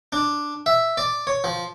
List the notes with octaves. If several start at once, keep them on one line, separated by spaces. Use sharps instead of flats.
D4
E5
D5
C#5
F3